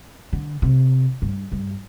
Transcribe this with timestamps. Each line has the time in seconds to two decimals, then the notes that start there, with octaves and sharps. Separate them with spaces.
0.33 D3
0.62 C3
1.22 G2
1.52 G2